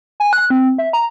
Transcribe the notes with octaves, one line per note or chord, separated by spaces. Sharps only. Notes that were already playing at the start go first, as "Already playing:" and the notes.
G#5
F#6
C4
E5
A#5